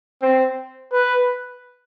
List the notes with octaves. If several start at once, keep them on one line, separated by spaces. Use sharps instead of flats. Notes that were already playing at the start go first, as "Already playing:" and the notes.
C4
B4